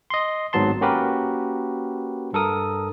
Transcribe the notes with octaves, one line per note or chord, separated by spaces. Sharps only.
D#5 C6
G#1 G#2 F#3 B3 A5 C6
A#3 C#4 F#4 G4 A#4 B4
G2 A4 A#4 D#6